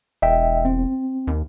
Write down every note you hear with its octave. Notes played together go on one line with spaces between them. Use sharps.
E1 D#5 E5 G5
C4
D#2